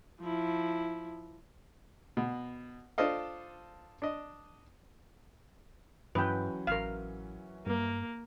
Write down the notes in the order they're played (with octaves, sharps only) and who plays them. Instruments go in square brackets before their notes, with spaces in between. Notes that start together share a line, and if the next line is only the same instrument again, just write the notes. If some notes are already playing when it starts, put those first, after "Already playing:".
[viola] F3 E4
[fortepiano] B2
D4 F4 A4 C5 D#5 F5
D4 D#5
[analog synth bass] G2 [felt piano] E3 F#3 C#4 [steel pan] B4 G5
[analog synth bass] A1 [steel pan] A#4 F5
[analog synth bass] G2 [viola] A#3